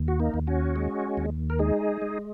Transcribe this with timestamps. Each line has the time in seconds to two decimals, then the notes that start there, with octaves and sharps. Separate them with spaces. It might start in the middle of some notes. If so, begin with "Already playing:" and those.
Already playing: D#2
0.08 F#4
0.20 A#3 D#4
0.34 D#2
0.47 C#4 F#4
0.76 G#3
1.17 D#2
1.50 A#4
1.59 G#3 D#4 G#4
2.02 G#3